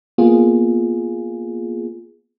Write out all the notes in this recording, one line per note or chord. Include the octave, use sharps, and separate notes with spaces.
A#3 B3 F4 G#4